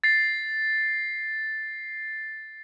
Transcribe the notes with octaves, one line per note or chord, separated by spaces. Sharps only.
A6 C7